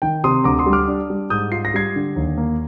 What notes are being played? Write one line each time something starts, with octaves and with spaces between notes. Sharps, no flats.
D#3 G5
C3 C6 D#6
D2 A#5 D6
C6 D#6
G3
D6 F6
D4
G3
G#2 D#6 G6
F4 C7
A#6
G3 G#6 C7
D3
D#2
A#3